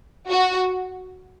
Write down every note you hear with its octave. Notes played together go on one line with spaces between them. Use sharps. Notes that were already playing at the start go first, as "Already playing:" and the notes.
F#4